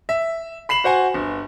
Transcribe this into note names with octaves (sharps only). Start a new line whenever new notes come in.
E5
B5 C7 E7 F#7
F#4 C5 F#5 G#5
G1